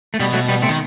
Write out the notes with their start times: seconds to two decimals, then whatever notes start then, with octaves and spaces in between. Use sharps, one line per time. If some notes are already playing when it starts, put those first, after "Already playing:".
0.14 A3
0.20 B2 G3
0.33 F#3 A3
0.49 G3 B3
0.63 A3 C4
0.69 D#3